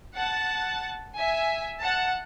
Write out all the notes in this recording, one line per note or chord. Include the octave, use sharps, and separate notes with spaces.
F#5 A5
E5 G#5
F#5 A5